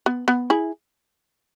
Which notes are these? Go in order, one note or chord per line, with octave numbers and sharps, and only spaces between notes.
B3
B3
E4 G#4